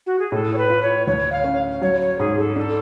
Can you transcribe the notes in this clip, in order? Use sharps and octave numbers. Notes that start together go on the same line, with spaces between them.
F#4
G#4
A2 A4
C#5
B4
F4
C#5
D2 C#5
F5
C#4
F#3 C#5
C#5
G#2 G#4
A4
D4 A4